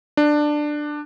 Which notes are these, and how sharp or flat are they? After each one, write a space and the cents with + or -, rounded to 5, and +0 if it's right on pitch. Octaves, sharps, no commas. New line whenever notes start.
D4 +15